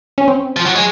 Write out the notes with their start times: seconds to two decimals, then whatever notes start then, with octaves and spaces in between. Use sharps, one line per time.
0.18 C#4
0.28 C4
0.57 F3
0.66 F#3
0.76 G#3